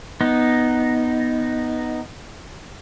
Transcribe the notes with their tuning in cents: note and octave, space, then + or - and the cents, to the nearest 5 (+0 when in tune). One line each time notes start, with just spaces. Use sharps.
B3 +0 D#4 +0